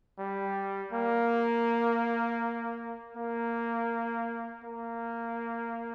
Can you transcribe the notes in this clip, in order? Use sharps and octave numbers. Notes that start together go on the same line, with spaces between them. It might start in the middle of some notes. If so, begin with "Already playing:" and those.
G3
A#3
A#3
A#3